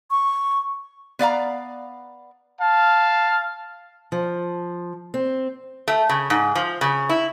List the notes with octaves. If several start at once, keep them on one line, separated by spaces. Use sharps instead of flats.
C#6
B3 D5 F5 A#5
F5 A5
F3
C4
A3
C#3
G#2
F3
C#3
E4